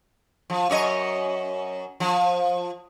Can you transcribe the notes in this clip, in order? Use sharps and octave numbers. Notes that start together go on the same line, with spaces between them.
F3
F#2 C#5 D#5
F3